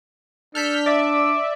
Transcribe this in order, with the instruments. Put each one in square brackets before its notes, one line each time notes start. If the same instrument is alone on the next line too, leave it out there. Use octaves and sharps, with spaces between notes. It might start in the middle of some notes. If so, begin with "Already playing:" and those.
[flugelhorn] D4 [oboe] A4 [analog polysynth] F6 G6 B6
[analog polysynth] D5 E5 [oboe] D6